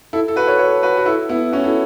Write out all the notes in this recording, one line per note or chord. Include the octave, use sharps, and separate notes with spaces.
E4 A4
A4
F#4 B4
A4 C#5
A4 C#5
F#4 B4
F#4
E4 A4
B3 E4
C#4 F#4
E4 A4